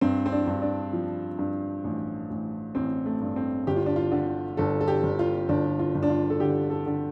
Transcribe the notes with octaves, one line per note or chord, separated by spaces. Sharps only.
G2 C4
C4
D4
G2
D4
F3
G2
A1
A1
A1 C4
A3
G2
C4
G1 G4
F4
D4
F4
D3
G1 A4
A4
G4
G1
F4
G1 D4
F4
G1
D4
F4
A4
D3 G4
A4
D3